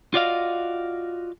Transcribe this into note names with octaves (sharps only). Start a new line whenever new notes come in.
F4 F#4 D5 D#5 F5